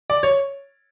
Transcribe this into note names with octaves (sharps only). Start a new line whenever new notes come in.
D5
C#5